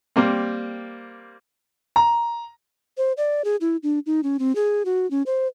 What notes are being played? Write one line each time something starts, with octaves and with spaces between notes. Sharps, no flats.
G3 A#3 C4
A#5
C5
D5
G#4
E4
D4
D#4
C#4
C4
G#4
F#4
C#4
C5